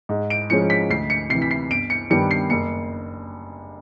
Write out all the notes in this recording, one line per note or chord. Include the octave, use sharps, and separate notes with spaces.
G#2
D7
F3 G#3 C#4 C#7
B6
D2 C7
C#7
C3 E3 C7
B6
C7
G1 D7
C#7
G2 D#3 G3 B3 C#7
C7
F#1 C#7